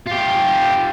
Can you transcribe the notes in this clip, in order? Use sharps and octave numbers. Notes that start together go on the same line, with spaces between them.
F4 G4